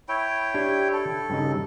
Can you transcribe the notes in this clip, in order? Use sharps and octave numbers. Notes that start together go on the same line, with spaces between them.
E4 C#5 G5
D4 G4
A4
G2 C#3 D#4